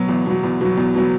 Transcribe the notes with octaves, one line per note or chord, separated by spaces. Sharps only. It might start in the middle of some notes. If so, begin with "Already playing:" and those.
Already playing: B2 F#3
E2
B2 F#3
E2
B2 F#3
E2
B2 F#3